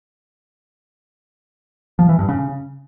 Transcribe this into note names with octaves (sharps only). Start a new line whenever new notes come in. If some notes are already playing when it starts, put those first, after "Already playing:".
F3
E3
G2
C#3